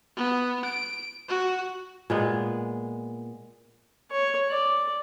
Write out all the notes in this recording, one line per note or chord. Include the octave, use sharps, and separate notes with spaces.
B3
D7
F#4
A#2 G#3 B3
C#5
D5